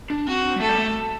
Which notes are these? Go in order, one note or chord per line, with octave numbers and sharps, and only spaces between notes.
D4
C4 F#4
G3
A3 A4
G3
A3